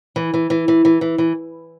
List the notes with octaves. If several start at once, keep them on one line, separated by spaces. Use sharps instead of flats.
E3
E3
E3
E3
E3
E3
E3